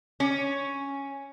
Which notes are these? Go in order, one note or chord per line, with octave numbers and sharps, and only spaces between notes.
C#4